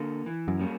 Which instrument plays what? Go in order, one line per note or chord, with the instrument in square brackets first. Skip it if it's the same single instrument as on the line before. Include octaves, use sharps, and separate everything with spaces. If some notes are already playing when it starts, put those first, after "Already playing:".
Already playing: [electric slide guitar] D3 A#3
E3
[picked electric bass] F#2
[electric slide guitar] G3 A#3 C#4